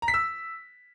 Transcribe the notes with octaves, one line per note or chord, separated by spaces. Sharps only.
A#5
B6
E6